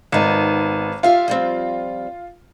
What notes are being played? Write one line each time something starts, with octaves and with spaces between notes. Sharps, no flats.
G#1 B3 D#4
F4 G4 E5 F5
F3 G3 C4